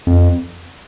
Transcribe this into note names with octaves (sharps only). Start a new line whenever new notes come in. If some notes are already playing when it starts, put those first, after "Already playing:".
F2